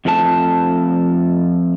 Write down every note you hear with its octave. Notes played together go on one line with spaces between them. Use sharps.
F2 F3 A3 D4 A5